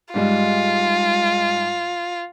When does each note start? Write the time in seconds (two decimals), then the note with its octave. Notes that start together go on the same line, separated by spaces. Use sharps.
0.14 G#2 G3 G#3 F4